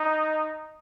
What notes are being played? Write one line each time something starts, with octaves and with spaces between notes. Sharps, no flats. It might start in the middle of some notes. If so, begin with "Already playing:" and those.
Already playing: D#4